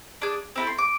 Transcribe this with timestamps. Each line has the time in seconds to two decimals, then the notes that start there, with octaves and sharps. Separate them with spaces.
0.22 D4 G#4
0.56 C4 E4 A4
0.67 C6
0.78 D6